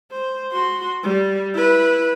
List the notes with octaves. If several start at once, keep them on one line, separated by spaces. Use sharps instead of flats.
C5
F#4 C6
G3
E4 B4